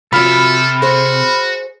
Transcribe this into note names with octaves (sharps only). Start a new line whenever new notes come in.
C3 F3 F#3 A4 B5 F6
F#4 G#4 C5